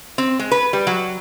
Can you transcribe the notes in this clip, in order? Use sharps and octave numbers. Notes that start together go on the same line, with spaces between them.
C4
G#3
B4
G3
F#3